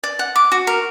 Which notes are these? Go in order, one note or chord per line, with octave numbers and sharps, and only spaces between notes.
D5
F#5
D6
F#4
A#4